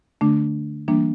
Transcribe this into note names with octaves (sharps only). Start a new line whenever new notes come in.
D3 A3 D4
E3 G3 A#3 D4